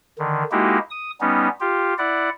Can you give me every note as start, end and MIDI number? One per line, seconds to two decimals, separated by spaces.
0.19 0.43 50
0.19 0.43 51
0.52 0.78 56
0.52 0.78 58
0.52 0.78 63
0.52 0.78 64
0.52 0.78 66
0.52 0.78 67
0.91 1.11 87
1.21 1.48 55
1.21 1.48 59
1.21 1.48 61
1.21 1.48 63
1.60 1.94 65
1.60 1.94 67
1.98 2.30 64
1.98 2.30 74
1.98 2.30 78